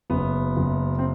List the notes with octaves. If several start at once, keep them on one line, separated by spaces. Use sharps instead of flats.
F#1 B3
F#1
C4